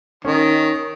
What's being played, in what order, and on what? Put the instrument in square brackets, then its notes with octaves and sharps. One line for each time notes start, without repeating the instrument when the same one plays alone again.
[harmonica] D#3 [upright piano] C#4